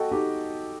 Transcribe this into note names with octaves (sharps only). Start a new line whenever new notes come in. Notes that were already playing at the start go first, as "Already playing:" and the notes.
Already playing: F#4 A4 D#5 G5
D#4 G4